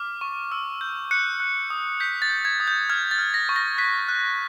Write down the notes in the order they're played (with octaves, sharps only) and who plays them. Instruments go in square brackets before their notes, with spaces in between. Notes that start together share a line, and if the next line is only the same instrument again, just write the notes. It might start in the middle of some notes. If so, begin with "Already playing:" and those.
Already playing: [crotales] D6 F6
C#6
E6
G6
F#6 C#7
F#6
D#6
G6 B6
A6
G6
G#6
D#6
G6
F6 G#6
A6
F6
A#6
C#6
A#6
F#6 B6
F#6